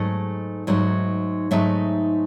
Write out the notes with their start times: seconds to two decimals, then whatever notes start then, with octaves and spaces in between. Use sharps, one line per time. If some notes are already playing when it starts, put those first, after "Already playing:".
Already playing: G#2 F#3 A3 D#4 D#5
0.67 G#2 F#3 A3 D#4
1.51 G#2 F#3 A3 D#4 E5